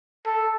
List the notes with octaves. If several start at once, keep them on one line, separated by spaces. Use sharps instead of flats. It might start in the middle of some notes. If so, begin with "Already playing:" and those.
A4